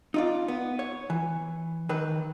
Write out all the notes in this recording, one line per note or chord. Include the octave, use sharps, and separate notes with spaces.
D#4 F4 D5
B3
C#5
E3
D#3 B4